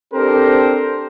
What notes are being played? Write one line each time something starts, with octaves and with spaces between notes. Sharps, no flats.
C4 D4 G4 A4 A#4 C5